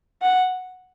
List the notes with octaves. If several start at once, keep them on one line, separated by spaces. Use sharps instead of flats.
F#5